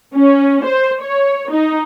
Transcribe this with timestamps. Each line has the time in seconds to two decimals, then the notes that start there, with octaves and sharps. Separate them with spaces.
0.15 C#4
0.64 C5
1.02 C#5
1.52 D#4